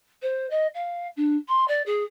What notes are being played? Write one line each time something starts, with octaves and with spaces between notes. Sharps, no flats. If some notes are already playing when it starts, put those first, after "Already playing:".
C5
D#5
F5
D4
C6
D5
G#4